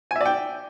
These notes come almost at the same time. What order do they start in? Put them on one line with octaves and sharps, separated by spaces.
G#5 E5 D5 G5